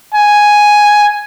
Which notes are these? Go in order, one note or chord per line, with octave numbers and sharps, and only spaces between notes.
G#5